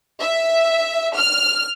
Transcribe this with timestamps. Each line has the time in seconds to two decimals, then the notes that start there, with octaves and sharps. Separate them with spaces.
0.21 E5
1.15 F6